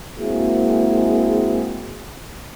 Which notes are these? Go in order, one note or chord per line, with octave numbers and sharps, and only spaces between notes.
G#3 A#3 C4 E4 F#4 G#4